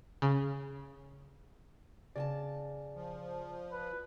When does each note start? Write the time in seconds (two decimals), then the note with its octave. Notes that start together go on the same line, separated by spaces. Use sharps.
0.22 C#3
2.16 C#3 D5 G#5 A5
2.95 F3
3.72 B4